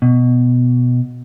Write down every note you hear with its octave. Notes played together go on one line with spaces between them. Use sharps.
B2